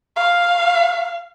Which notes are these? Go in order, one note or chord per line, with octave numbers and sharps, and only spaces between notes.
F5